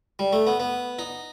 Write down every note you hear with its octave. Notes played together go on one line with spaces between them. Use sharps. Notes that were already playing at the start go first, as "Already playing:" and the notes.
G3
A3
B3
B3
D#4